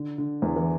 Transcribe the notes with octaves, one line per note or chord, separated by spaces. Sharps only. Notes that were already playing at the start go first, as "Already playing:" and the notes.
Already playing: D3
D3
E2 E3
E3